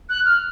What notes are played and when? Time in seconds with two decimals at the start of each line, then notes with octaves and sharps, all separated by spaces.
0.09 F#6
0.25 F6